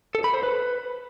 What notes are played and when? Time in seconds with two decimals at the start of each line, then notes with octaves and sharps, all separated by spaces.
0.15 A4
0.24 B5
0.34 C5
0.43 B4